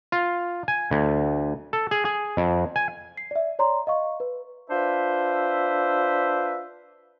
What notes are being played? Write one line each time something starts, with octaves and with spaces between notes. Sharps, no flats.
F4
G#5
D2
A4
G#4
G#4
F2
G#5
C7
D5 E5
C#5 D5 A#5 C6
D#5 F5 C#6
B4
D4 F4 B4 C5 E5